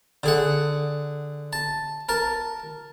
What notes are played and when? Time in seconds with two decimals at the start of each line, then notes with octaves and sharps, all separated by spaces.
0.24 D3 G#4 F#5
1.53 A5
2.09 A#4 A5